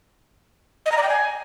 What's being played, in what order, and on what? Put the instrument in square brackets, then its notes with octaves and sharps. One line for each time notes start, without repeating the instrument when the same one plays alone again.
[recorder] D#5
A#5
D5
G5
G#5